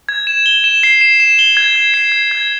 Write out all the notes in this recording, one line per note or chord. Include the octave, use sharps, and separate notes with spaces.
G#6
E7
G7
E7
C7
E7
E7
G7
G#6
G#6
C7
G#6
G#6